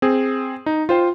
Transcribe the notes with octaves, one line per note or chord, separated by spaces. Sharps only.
C4 G#4
D#4
F4 C5 G5